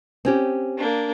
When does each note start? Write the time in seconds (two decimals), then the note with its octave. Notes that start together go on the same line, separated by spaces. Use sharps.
0.25 C4 C#4 G4
0.78 A#3 D4